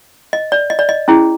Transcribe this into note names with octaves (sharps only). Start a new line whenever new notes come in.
D#5
D5
D#5
D5
D#5
C#4 E4 G#4